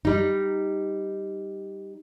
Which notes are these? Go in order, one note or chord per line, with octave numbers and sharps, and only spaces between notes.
G3 D#4